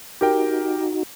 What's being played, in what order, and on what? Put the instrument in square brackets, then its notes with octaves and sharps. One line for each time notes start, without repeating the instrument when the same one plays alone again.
[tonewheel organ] D#4 F#4 [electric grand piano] G4 A#4 G5